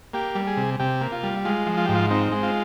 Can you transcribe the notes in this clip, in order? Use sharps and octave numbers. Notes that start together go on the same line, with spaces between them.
A#3 G4
G3
G#4
C3
C3 G4
A#3
F4
G3
G#3 F4
F3
F4
G#2 G4
F4
C4 D#4
G#3
F4